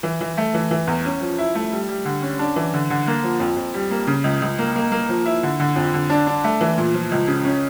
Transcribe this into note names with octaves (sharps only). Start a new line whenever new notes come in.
E3
E3
A3
E3
E3
E2
C#4
F3
E4
A3
G3
G3
D3
C#4
D4
E3
D3
D3
A#3
F3
F2
F2
G3
A#3
C#3
C#2
C#2
A#3
A#3
A#3
F3
E4
D3
D3
F2
D3
D4
D4
A3
E3
A#2
F3
C#2
C#3
C#4